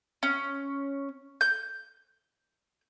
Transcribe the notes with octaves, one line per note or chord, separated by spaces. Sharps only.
C#4
G6